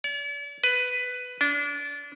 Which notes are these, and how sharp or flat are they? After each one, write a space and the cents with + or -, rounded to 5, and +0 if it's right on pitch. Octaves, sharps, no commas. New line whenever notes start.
D5 -45
B4 +10
D4 -30